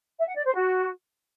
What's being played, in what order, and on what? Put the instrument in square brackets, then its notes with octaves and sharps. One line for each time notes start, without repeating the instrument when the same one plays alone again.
[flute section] E5
F#5
D5
C5
F#4